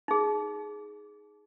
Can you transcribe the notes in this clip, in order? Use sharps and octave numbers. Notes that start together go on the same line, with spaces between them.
D#4 G#4